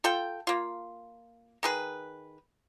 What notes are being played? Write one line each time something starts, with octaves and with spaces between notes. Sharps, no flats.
F4 A4 G5
A#3 F4
D#3 G#4 B4